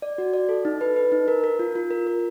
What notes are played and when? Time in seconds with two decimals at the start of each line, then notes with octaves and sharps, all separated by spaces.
0.02 D5
0.18 F#4
0.33 D5
0.49 A4
0.65 D#4
0.81 B4
0.96 B4
1.12 D#4
1.28 A#4
1.44 A#4
1.59 F4
1.75 F4
1.91 A#4
2.07 A#4